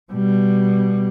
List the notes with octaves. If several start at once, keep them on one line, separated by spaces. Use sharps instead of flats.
B2 G3